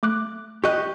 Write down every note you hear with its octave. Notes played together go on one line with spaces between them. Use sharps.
A3 D6 F#6
G4 D#5 C#6 F#6